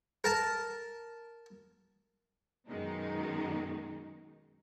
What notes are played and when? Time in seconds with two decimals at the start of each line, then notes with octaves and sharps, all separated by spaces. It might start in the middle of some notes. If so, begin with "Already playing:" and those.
0.24 A#4 A5
2.68 F#2 B2 D#3 G#3 D#4